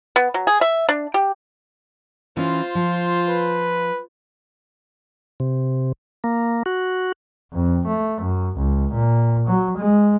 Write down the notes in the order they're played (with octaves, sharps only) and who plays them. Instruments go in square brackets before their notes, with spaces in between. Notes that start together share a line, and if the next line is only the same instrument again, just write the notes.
[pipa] B3
F#3
G#4
E5
D4
G4
[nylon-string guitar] E3 C#4 [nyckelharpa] F4 C5
[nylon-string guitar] F3
[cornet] B4
[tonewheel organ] C3
A#3
F#4
[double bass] F2
A3
F#2
C#2
A#2
F#3
G#3